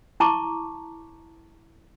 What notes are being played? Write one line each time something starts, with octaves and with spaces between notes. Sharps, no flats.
E4 A5 A#5 C#6 D6